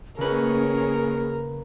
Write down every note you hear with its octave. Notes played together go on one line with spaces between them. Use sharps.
C#3 A#3 C#4 G#4 A#4 B4